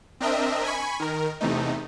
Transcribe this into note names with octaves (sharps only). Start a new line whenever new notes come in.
C4 D4 A#4 D#5 E5
G#5 B5 C#6
D#3 A#4
E2 C3 A3 D#4